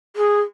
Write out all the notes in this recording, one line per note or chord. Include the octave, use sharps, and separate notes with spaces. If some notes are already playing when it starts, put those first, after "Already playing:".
G#4